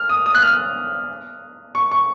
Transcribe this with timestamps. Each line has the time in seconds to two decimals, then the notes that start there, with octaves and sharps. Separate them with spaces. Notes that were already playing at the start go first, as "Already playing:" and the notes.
Already playing: F6
0.09 D#6
0.26 D#6
0.35 F#6
0.42 F6
1.75 C#6
1.91 C#6